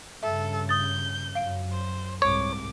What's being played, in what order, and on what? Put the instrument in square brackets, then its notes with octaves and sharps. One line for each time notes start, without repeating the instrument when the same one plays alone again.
[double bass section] G2 C#3 [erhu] A4 [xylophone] E5
[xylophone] D#6 A6 [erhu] G6
[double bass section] F#2 [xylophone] F5 D7
[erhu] C5
[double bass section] C2 G#2 [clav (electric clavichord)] C#5 [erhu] D6